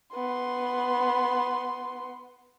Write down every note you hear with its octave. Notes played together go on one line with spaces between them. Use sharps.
B3 C6